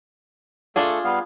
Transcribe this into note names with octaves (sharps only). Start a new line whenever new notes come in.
A3 D4 F4 G#4 A4
G3 B3 F5